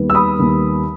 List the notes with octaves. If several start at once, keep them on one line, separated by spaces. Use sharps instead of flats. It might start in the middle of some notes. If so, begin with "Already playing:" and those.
Already playing: D#2 D#3 G3 B3
E6
B5 D#6
D#2 D#3 G3 B3